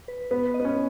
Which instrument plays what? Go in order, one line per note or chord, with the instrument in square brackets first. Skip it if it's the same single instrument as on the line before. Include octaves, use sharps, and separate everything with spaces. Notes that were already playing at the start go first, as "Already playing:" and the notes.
[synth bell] B4
[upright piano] B3 [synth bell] B4
[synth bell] D#5
[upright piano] B3
C#4